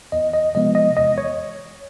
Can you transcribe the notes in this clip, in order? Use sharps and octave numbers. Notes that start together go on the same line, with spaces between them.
E2 D#5
D#5
C3 F3 G#3 B3 D#5
D#5
E2 D#5
C#5